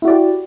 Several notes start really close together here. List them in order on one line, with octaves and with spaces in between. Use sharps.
E4 F#4 D5 G4